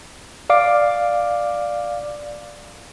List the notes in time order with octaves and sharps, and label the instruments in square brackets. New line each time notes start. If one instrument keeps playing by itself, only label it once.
[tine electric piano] D5 F5 D6